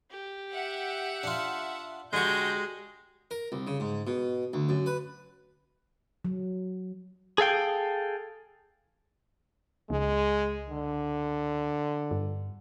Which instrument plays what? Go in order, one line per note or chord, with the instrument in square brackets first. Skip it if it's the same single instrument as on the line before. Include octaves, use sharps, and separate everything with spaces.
[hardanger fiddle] G4
[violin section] E5 F#5
[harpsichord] D4 F4
[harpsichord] D3 C#6 [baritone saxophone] G#3 [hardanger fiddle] F#4 G4 [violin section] G6
[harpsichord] A#4
C2
C#3
G#2
B2
D2
F#2
B4
[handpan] F#3
[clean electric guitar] G#4 A4 F5 G5
[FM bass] C#2 [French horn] G#3
[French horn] D3
[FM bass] G2